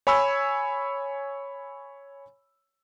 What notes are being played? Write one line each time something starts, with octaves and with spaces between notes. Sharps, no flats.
C#5 G#5 B5 C#6 E6